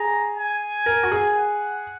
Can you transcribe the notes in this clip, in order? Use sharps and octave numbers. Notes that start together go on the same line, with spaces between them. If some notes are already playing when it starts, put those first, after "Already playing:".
Already playing: G#4 A#5
G#5
A#4
F#4
G#4
F#5